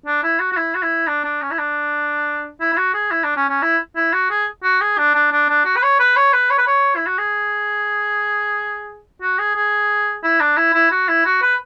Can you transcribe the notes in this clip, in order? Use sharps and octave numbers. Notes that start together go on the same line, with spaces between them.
D4
E4
F#4
F#4
E4
F#4
E4
D4
D4
C#4
E4
D4
E4
E4
F#4
G#4
E4
D4
C#4
C#4
E4
E4
F#4
G#4
F#4
G#4
D4
D4
D4
D4
F#4
B4
C#5
B4
C#5
B4
C#5
B4
C#5
E4
F#4
G#4
F#4
G#4
G#4
E4
D4
E4
E4
F#4
E4
F#4
B4